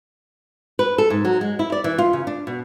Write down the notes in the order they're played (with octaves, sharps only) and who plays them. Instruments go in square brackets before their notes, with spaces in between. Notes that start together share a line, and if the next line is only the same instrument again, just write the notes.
[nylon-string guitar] B4
A4
G#2
F#3
G#3
E4
D5
E3
F4
C#3
D4
B2